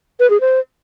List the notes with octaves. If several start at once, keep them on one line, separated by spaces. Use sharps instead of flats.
B4
G#4
C5